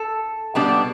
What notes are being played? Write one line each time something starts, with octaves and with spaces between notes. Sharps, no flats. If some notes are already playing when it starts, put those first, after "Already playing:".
Already playing: A4
B2 G3 B3 D4